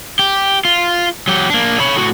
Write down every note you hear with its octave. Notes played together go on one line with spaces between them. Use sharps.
G4
F4
F#3 G4
A#3 D4
C#5 B5
A2 F#4